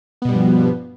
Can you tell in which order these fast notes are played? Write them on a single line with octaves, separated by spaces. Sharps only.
B3 B2 G3 G2 F3